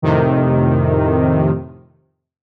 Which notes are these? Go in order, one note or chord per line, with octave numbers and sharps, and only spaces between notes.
F2 A2 C3 D#3